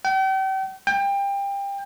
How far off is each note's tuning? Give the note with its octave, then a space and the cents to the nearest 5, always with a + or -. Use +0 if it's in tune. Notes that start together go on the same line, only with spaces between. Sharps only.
G5 -40
G5 +25